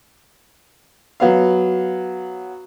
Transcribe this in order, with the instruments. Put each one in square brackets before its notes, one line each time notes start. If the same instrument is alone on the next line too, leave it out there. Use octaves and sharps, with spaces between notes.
[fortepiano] F#3 B3 F5